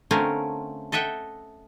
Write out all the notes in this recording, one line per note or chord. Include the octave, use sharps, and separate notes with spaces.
D3 A3 C4 C#4 F4 A#4
A4 D#5 E5 F#5 G5